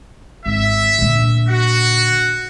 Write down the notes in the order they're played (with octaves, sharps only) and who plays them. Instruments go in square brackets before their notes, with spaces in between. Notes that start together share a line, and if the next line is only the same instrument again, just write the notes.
[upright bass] G#1 [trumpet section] E5
[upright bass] A#2 D3
[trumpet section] F#4